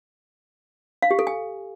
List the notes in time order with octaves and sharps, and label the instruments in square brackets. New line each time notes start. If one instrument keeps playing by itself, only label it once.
[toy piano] F5
G4
A4
G#5